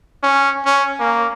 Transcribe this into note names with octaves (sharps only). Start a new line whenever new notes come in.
C#4
C#4
A#3